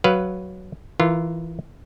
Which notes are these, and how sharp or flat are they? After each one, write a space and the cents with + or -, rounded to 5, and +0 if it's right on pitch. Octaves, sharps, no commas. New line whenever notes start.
F#3 +5 B4 +0 F5 +0
E3 +0 F4 -20 A#4 +0